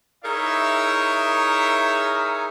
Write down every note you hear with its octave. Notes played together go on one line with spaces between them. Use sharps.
D#4 E4 G#4 A#4 C#5 E5